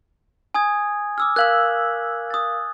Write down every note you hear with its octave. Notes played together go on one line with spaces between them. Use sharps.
G#5 D#6 G#6
D6 E6 F6
A#4 F5 E6 F#6 G#6 F#7
D#6 A6